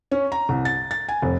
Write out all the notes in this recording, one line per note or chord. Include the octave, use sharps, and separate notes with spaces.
C#4
A#5
C2
A6
A6
G#5
F1